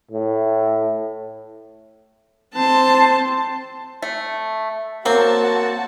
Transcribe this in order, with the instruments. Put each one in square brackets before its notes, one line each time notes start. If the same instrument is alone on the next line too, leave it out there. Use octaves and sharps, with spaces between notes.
[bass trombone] A2
[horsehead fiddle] C4 C5 [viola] A5
[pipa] A3
[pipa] F#3 C4 [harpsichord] A#3 [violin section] F#4 A5